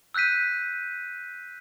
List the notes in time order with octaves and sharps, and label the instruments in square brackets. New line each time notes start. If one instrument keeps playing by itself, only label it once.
[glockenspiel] E6 F#6 G6 B6 D#7